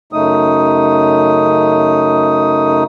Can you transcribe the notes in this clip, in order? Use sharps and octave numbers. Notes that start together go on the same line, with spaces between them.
F#2 C#3 A3 D#4 D#6